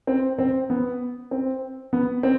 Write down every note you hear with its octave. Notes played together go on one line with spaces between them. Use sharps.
C4
C4
B3
C4
B3
C4